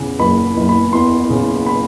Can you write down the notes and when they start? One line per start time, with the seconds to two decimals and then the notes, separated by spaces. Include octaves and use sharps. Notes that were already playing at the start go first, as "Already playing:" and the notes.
Already playing: E2 C#3
0.19 F#1 B5
0.57 F#1
0.69 B5
0.92 E2 C6
1.30 C#3
1.66 B5